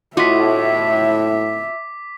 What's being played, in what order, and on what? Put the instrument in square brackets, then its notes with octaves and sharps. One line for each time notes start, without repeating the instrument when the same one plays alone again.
[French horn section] A2 [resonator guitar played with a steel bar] F4 F#4 D#5 [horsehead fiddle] E5 [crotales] D6 B6